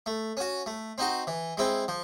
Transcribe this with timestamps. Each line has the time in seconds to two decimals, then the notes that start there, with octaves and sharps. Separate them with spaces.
0.06 A3
0.37 C#4 F#4
0.66 A3
0.98 C4 D#4 F#4
1.27 E3
1.57 G#3 C4 E4
1.88 F3